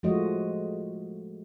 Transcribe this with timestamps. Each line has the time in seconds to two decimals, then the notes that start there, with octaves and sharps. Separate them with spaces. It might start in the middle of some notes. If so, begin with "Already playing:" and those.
0.03 F3 G#3 A3 F4 F#4 D#5